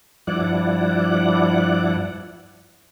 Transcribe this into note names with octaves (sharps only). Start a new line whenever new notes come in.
G2 F3 E4 D5 F#5